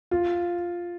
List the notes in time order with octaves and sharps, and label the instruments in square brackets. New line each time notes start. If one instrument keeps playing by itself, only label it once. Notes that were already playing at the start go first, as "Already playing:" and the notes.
[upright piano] F4